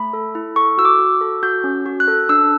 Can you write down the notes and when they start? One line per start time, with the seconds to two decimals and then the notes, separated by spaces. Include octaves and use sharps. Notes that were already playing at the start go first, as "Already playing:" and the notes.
Already playing: A3 B5
0.13 A4
0.35 E4
0.56 A4 C#6
0.78 F#4 E6
0.85 D6
0.99 F#4
1.21 A4
1.43 F#4 G6
1.64 C#4
1.86 F#4
2.00 F#6
2.08 A4
2.29 D4 E6